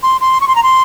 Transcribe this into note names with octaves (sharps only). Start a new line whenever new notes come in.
C6
C6
C#6
C6
A#5
C6